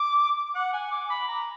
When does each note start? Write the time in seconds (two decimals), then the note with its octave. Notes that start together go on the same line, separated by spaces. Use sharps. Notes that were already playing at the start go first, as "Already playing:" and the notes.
Already playing: D6
0.55 F#5
0.73 G#5
0.91 D6
1.10 B5
1.28 A#5